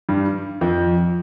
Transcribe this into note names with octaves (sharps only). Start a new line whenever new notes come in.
G2 G3
F2 F3